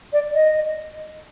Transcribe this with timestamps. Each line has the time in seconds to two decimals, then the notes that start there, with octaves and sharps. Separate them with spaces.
0.13 D5
0.34 D#5